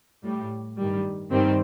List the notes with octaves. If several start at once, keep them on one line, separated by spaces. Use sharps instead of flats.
A2 G3
G2 D#3 G3
G2 D#3 G3 C4